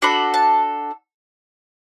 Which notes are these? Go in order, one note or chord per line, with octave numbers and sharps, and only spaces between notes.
D4 F#4 A4 B5
A5